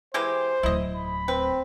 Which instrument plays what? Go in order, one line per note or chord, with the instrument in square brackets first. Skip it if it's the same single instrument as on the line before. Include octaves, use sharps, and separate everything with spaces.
[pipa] E3 G#3 G4 [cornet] C5
[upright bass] D1 D2 [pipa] E4 D#5
[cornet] B5
[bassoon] C4 [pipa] B4